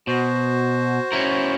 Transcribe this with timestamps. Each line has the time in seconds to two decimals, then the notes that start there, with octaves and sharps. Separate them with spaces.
0.07 B2 F#4 C5
1.12 C#4 E4 A#4